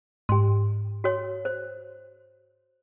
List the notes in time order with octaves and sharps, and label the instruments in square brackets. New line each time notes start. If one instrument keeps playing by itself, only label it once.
[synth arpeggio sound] G#2 G4 [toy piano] C6
[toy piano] F#4 C#5
C5